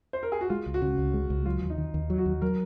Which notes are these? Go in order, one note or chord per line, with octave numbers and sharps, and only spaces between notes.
C5
A#4
G#4
F#4
G#3 F4
C#2
F#4
C#3
C#2
G#3
C#2
F#3 F4
D#2
D#4
D#3
D#2
F#3
F#4
D#2
F#3 A#4